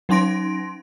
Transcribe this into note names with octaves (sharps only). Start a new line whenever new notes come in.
F#3 C#4 D#4 C6 A#6 D7